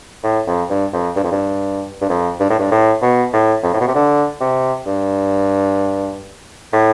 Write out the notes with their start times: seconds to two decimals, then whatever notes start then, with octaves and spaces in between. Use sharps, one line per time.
0.23 A2
0.47 F2
0.70 G2
0.93 F2
1.16 G2
1.24 F2
1.31 G2
2.02 G2
2.09 F2
2.40 G2
2.50 A2
2.59 G2
2.71 A2
3.02 B2
3.33 A2
3.63 F2
3.73 A2
3.80 B2
3.87 C3
3.95 D3
4.41 C3
4.87 G2
6.73 A2